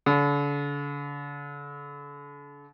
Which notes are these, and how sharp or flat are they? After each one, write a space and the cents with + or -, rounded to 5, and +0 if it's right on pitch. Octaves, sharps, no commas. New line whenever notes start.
D3 -40